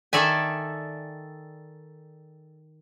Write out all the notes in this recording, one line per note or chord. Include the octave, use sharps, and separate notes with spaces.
D#3 A4 D5 E5 G#5